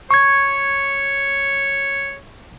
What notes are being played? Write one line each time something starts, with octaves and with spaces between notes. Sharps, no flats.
C#5 C#6 G#6